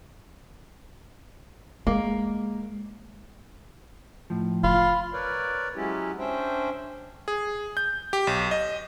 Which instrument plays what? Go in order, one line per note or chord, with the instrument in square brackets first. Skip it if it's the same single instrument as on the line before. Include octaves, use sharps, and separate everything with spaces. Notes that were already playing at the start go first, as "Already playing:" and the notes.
[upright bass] G#3 [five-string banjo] A#3
[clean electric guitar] A2 F3
[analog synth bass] F#1 [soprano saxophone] F4 [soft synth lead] B5
[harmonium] A#4 B4 C#5 D5
F#3 G#3 C#4 E4 G4
C#4 D4 C5 E5 G5
[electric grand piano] G#4
G6
G4
B1
D#5